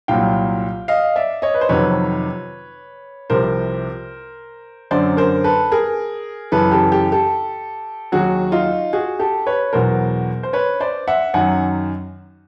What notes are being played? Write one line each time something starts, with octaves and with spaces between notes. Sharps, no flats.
C2 A#2 F#3 F5 G5
D#5 F5
D5 E5
C#5 D#5
B4
C5
F2 C3 D#3 F#3 B4 C#5
C2 C3 F3 A#4 C5
F#2 D3 F#3 C5 D5
A#4 C5
A4 B4
G#4 A#4
F#2 C#3 E3 A4 B4
G4 A4
G4 A4
G4 A4
D#2 D#3 F#3 F#4 G#4
D#4 F4
F#4 G#4
G4 A4
B4 C#5
E2 B2 F#3 A#4 C5
C5
B4 C#5
C5 D5
E5 F#5
F#2 D#3 F#3 F#5 G#5